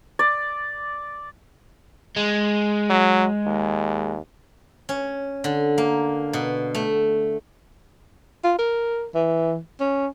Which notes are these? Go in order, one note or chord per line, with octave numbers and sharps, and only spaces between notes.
D5
G#3
F#3
D#2
C#4
D3
A#3
B2
A3
F4
A#4
E3
C#4